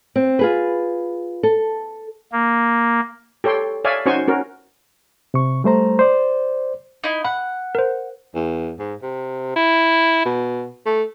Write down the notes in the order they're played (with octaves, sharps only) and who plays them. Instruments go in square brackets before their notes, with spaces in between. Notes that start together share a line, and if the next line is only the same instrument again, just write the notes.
[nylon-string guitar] C4
F4 G#4 B4
A4
[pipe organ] A#3
[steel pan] G4 A4 C#5 G5 C6
C#5 D5 E5 F5 G#5
C#4 D#4 F#4 C5 G#5 C#6
C#4 F#4 A#4
[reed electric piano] C3 C#6
G3 A3 C5 A#5
C5 D5
[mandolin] D#4 E4
[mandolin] F#5 [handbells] B5
[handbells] A#4 C5
[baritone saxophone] E2
G#2
C3
E4
B2
A3